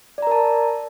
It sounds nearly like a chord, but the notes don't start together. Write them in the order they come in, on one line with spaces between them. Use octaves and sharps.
D5 A#5 A#4 A5